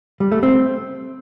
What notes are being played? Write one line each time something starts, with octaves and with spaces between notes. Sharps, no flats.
G3
A3
C4